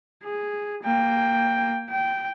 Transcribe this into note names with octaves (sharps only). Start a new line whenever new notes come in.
G#4
A#3 G5
G5